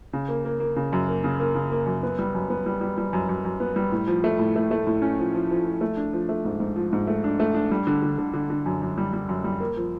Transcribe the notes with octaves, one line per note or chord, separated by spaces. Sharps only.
C#3
A#3
A#3
A#3
C#3
F#2
A#3
C#3
A#3
C#3
A#3
F#2
B3
G3
F#2
B3
G3
G3
G3
F#2
F#2
F#2
B3
G3
A2
F3
A3
A2
A3
A3
A2
C#4
F3
F3
F3
F3
A3
D4
F3
A3
G#2
G#2
F3
G#2
A3
D4
A3
D4
G3
D3
D3
D3
D3
D3
F#2
F#2
G3
G3
F#2
G3
A#3
F3